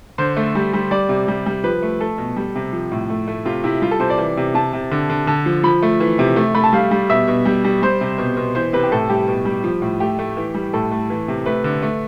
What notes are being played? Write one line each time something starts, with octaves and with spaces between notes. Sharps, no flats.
D3 C5
A3
G3
G3
G3 D5
C3
G3
G3
F3 B4
A3
A3 A4
B2
G3
C3
F3
A2
A3
A3
C3 F4
C3 E4
G3 F4
A4
C3 C5
D5
E3
C3
C3 A5
C3
D3
D3
D3 A5
F3
F3 B5
A3
E3
C3
A3
A3 B5
A5
G3 F5
G3
B2 E5
B2
G3
G3
G3 C5
C3
B2
B2
E3 C5
C3 B4
G4
A2 A4
G3 G4
B2
G3
F3
A2
A3 G4
A3
E3
G3
A2 A4
A3
E3
C3
A3 B4
D3
A3